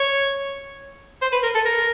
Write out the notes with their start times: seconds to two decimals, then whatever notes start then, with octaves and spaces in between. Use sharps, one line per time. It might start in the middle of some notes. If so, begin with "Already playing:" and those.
Already playing: C#5
1.22 C5
1.33 B4
1.43 A#4
1.55 A4
1.65 A#4